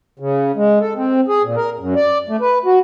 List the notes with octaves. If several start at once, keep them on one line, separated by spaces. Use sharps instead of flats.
C#3
G#3
A4
C4
G#4
A#2
A#4
F#2
D5
A3
B4
F#4